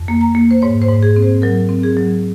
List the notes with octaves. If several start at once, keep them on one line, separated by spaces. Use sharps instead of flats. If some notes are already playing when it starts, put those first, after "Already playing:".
Already playing: F2
A#3
A#5
A#3
C5
G#2 C#5
C5
G#2
G#4
C4
C5
F#3 A#4
C4
G#4
F#3